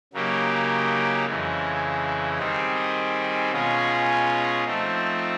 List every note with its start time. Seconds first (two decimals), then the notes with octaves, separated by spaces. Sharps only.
0.13 C#3 F#3 A#3 D#4 G4
1.26 F2 C#3 E3 G#3
2.38 D#3 G3 C4 D#4 G#4
3.51 B2 G#3 C#4 F4 G#4
4.65 F3 A3 C4 D#4